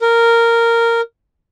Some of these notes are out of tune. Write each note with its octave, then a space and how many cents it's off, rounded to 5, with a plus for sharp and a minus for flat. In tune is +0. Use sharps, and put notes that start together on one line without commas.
A#4 -10